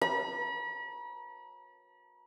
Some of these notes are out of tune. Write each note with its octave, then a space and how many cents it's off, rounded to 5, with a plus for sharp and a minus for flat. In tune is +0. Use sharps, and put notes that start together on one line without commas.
B5 -40